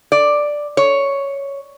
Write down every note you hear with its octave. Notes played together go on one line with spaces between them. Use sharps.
D5
C#5